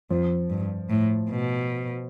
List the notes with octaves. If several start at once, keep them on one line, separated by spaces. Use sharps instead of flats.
F2 F3
G2
A2
B2